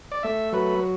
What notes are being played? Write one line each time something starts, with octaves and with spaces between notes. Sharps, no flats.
D5
A3 E5
F#3 B4